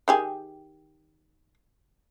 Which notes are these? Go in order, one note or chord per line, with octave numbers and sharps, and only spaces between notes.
D#3 G4 G#4